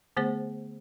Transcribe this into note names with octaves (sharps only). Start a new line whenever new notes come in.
D3 A3 B3 G#4 C5